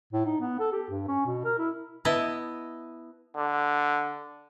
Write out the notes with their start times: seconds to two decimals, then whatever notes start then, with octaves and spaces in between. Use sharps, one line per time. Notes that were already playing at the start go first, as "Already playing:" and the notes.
0.13 A2
0.25 D#4
0.40 B3
0.59 A4
0.72 G4
0.90 G2
1.08 C#4
1.26 B2
1.44 A#4
1.58 E4
2.05 B3 E4 D#5 A5
3.37 D3